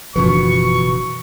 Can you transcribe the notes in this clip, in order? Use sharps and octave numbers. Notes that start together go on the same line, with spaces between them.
F#1 B2 E3 F3 D4 C#6